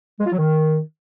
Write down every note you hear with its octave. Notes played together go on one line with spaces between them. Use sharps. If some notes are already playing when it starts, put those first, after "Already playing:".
G#3
F4
F#3
D#3